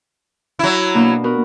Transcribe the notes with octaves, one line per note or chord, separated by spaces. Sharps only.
F#3 E4
B2 A#3 D4
B3 F#4 A#4